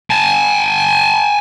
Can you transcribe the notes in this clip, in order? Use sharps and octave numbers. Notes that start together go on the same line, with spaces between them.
G#5 A5